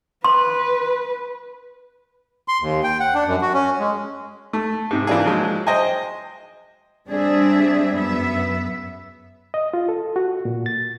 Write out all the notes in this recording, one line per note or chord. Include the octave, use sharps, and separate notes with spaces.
B4 C6
C6
D#2
G5
F#5
D4
F#2
F#4
C#4
G#3
A3
G#2 C3
E3 A#3 D4 F4 G#4
F3 F#3 G#3
C5 D#5 G5 G#5
G3 C4 D4 G#4 E5
F#2 B3 E5
D#5
F4
A4
F#4
A#2
A6